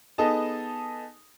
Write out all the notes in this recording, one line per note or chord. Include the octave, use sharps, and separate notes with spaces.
B3 D#4 G#4 A4 D#5 A5